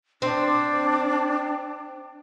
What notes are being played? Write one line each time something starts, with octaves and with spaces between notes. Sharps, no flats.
C4 D4